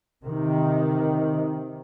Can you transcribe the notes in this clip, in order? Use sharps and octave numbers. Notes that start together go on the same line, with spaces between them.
C3 D#3